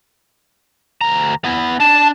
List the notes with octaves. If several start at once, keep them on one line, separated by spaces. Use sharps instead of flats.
D2 A#5
B3 E4
D4 A5